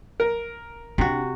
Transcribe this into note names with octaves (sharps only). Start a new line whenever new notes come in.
A#4
C3 D4 F#4